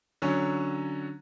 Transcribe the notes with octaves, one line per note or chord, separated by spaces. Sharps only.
D3 F#3 C#4